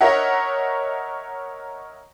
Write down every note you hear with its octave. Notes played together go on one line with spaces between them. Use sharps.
A#4 C#5 D#5 E5 F#5